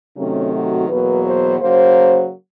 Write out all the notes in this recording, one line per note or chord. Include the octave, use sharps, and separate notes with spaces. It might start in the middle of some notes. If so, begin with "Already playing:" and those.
C3 D#3 F#3 A3 C#4
F#4
E2 B2 F#3 A#3 B4
C5
C#3 F#3 A#3 C5